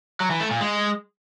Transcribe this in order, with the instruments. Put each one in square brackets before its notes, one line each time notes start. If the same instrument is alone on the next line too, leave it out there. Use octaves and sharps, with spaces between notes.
[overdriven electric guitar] F#3
E3
A3
A#2
G#3